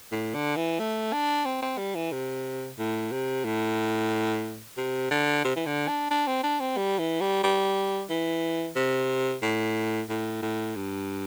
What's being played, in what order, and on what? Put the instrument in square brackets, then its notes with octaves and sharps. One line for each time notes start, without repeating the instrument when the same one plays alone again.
[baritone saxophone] A2
D3
E3
A3
D4
C4
C4
G3
E3
C3
A2
C3
A2
C3
D3
C3
E3
D3
D4
D4
C4
D4
C4
G3
E3
G3
G3
E3
C3
A2
A2
A2
G2